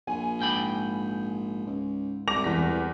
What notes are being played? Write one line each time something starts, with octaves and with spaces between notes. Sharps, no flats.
A#1 G#5
G#2 G5 B5
C#2
C2 D6 A#6 F7
E2 B6